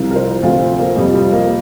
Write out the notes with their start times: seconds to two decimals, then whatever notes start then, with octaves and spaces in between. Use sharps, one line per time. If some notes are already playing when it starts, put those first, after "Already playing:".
Already playing: C2 C3 F3
0.11 A#4
0.16 C5
0.42 D2 C3 F3 F4
0.60 C4
0.79 A#3
0.96 F2 C3 F3 G3
1.14 G3
1.32 A#3